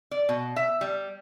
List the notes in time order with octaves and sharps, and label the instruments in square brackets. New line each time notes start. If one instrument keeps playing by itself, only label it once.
[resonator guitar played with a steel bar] D5
B2
E5
G3